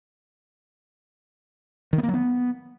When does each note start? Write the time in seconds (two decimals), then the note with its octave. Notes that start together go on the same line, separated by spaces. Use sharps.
1.93 D#3
1.98 B3
2.03 A#3
2.09 F#3
2.14 B3